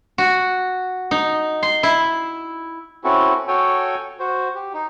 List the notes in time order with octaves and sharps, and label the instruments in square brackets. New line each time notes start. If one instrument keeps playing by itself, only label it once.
[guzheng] F#4
D#4
C6
E4
[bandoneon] C4 C#4 E4 F#4 A4
F#4 A4 C#5 G5 G#5
F#4 C5
G4
D#4